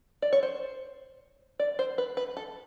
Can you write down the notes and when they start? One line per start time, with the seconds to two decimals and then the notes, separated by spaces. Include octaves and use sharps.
0.22 D5
0.33 C#5
0.43 C5
1.59 D5
1.79 C5
1.98 B4
2.17 B4
2.37 A4